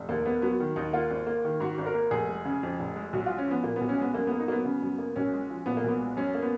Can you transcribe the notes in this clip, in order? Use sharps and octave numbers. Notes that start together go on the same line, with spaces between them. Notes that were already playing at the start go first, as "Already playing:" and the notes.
Already playing: F1
D#2 A#3
A#3 B3
F#3 B3
D#3
D#2 D#4
A#3 F4
G#1
A#3
D#3
G#2 F#4
G#1
A#4
A#3
F1 G#4
G#3
C#3
F2
F1
G#3
B1 F#4
G#3 F4
C#4
F3 B3
A#2 A#3
B3
B1
C#4
G#3 B3
F#2 A#3
A#3 B3
D#4
F#3 A#3 B3
C#3
F#2
A#3
B1 C#4
G#3
F3
A#2 B3
A#3
B1 B3
G#3
F#2 C#4
A#3
B3